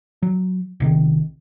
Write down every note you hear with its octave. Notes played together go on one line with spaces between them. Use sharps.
F#3
A#1 C3 D#3